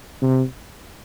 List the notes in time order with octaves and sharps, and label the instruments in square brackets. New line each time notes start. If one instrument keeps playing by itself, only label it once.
[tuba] C3